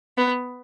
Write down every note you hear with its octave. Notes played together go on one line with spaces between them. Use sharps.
B3